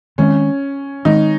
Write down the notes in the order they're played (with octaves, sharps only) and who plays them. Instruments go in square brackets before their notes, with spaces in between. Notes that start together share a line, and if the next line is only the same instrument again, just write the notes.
[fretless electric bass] D#3 G#3 C4 [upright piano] C#4
[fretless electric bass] D#3 G#3 C4 [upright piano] D#4